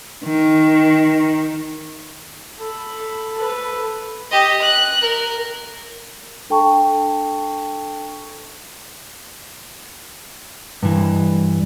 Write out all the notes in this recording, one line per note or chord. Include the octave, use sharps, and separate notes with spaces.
D#3
A4 B5
A4 B4
G4 D#5
F#6
A#4
D4 A4 G5 A5 C#6
G2 E3